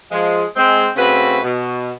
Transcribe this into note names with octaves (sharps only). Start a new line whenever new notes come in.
F3 G#3
G#3 C4
C#3 A3 C4 F#4 B4
B2